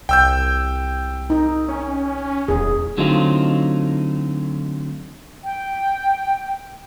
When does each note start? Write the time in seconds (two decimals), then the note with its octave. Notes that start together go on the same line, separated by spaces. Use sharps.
0.09 C2 G5 E6 G6
1.30 D#4
1.69 C#4
2.48 D#1 E2 G#4
2.97 D3 F#3 A3 C4 D#4 F4
5.44 G5